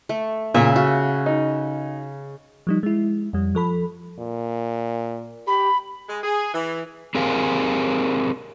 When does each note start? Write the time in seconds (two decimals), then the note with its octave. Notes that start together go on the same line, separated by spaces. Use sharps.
0.09 A3
0.54 A#2 C#3 A4 E5
0.76 F#4 F5
1.26 D#4
2.67 F3 G3 D#4
2.83 G#3 E4
3.33 F2 G3
3.55 F3 A4 B5
4.19 A#2
5.47 G4 B5
6.08 G#3
6.23 G#4
6.54 E3
7.15 C4 G4 G#4 A#4 F5